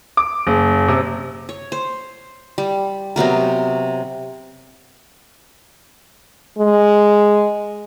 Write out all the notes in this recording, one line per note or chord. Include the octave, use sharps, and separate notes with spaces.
D6
F#1
C3
C#5
C5
G3
C3 F#3 B3 A#4
G#3